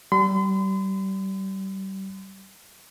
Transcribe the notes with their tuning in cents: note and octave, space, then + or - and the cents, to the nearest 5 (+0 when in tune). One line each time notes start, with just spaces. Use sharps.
G3 -30 C6 -40